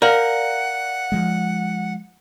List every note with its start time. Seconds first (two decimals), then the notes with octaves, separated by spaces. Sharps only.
0.02 A#4 D5 F5 F#5
1.12 F3 G#3